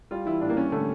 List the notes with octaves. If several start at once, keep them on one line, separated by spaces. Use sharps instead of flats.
G3 F4
E3 E4
A2 D4
A#3
G3 C#4
D3 A3